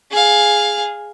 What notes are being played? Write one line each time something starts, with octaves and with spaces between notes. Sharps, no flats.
G#4 F5